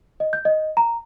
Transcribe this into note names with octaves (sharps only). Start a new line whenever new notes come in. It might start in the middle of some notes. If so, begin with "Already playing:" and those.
D#5
G6
D#5
A#5